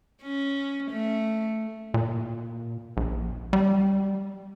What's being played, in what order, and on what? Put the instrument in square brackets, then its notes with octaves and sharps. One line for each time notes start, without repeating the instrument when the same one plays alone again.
[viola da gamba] C#4
A3
[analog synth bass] A#2
A#1
G3